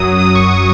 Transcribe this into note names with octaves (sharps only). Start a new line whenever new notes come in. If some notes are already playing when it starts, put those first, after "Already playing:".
Already playing: F#2 F#3 D#6
F#3 D#6
C#6
C#6